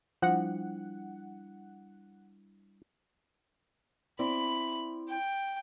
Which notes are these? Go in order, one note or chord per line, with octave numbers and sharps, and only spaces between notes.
F3 G3 D4 E4 F#5
C4 E4 D5 B5
G5